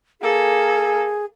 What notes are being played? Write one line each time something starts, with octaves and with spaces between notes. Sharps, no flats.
A#3 G#4 A4